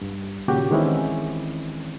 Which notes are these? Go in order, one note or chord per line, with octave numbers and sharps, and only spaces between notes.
G2
D#2 A#2 C#3 F#4 G4
D#3 E3 G#3 C4 C#4 E4